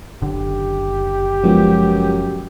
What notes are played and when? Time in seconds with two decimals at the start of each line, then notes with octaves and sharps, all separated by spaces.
0.22 F#1 D3 G4
1.43 F#2 F3 G#3 B3